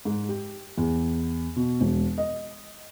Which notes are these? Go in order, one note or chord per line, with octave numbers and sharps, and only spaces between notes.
G#2
G4
E2
B2
E1
D#5